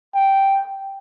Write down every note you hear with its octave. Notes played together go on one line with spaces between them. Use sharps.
G5